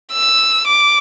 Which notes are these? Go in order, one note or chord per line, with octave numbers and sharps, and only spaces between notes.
E6
D6